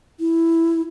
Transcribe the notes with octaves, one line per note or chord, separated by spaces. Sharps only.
E4